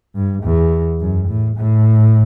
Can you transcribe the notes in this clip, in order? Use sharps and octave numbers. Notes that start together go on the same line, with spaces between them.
G2
E2
F#2
A2
A2